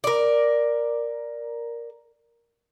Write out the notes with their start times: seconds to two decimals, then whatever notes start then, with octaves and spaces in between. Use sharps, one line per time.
0.04 A#4 D5